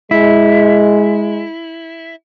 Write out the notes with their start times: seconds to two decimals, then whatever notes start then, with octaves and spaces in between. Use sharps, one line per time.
0.11 G#3 E4